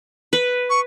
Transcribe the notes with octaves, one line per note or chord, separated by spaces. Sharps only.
B4
C#6